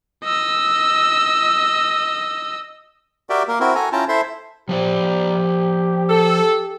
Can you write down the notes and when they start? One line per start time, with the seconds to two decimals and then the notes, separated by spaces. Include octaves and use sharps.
0.24 D#5 E6
3.30 F#4 G4 A#4 D5 E5 G5
3.48 A#3 A#4
3.60 C4 E4 F#4 A#4
3.75 F#4 A4 G#5 A#5
3.92 C#4 E4 F4 G5 A5 A#5
4.08 E4 A4 C5 E5 C6
4.69 F3 G4 C5 D5
6.09 A4